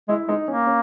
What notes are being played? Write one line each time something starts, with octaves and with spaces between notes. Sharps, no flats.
G#3 E4
G#3 D#4
A#3 C#4
C#4